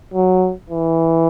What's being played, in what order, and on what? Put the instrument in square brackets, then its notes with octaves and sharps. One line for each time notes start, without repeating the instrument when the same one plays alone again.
[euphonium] F#3
E3